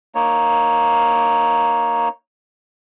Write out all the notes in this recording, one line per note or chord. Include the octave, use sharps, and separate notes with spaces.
A#3 D#4 C#5